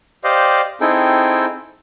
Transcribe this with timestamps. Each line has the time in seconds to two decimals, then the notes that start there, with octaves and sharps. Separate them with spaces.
0.24 G4 C5 D5 D#5 F5
0.81 C4 D#4 E4 G#4 A4 G5